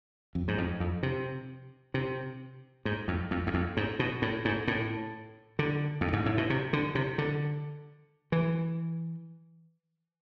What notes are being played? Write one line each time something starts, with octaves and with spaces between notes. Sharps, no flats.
F2
G#2
F2
F2
C3
C3
G#2
F2
F2
E2
F2
G#2
B2
A2
G#2
A2
D3
F2
G#2
A2
B2
C3
D3
C3
D3
E3